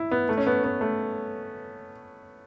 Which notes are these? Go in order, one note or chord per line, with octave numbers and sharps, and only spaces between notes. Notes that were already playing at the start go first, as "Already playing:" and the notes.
Already playing: E4
B3
A3
C#4
B3
B3
A3